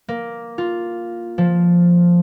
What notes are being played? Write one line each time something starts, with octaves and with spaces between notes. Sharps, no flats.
A#3
F4
F3